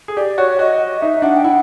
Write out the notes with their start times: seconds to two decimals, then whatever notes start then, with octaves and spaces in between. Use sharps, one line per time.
0.08 G#4
0.17 G4 D5
0.38 F#4 C#5
0.59 F#4 D#5
1.01 D#4 E5
1.22 D4 F#5
1.36 G5
1.44 E4 F#5